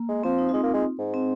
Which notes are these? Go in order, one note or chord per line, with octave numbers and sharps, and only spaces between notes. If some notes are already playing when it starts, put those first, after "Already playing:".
Already playing: A#3
G#3
F3 C4
D#4
F4
G#3 D#4
A#3
G#3
G#2
C4